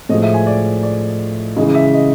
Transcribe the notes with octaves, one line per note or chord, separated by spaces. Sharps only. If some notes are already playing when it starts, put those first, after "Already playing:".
A2 F3 G#3 D#5
E5
G#5
D5
D5
C#3 E3 G#3 D#5
E5
D#5